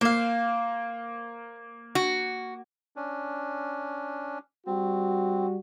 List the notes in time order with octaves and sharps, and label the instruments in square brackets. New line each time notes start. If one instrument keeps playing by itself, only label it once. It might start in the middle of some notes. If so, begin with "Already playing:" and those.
[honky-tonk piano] A#3 [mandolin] C5 F5
[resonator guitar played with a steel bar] F#4
[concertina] C#4 D4
[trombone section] G3 F#4 [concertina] C4